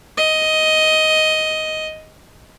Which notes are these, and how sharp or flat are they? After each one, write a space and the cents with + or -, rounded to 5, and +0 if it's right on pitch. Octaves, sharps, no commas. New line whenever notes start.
D#5 +10